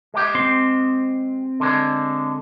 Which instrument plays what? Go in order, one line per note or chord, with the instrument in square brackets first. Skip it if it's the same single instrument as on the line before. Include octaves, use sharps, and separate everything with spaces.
[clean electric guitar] G#3 G4
[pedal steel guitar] C4 C6
[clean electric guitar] D3 G#3